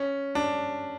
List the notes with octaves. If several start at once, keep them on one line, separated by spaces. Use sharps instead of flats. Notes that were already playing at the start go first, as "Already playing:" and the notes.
Already playing: C#4
D4